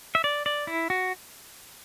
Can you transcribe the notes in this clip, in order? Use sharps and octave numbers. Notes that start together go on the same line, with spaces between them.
E5
D5
D5
E4
F#4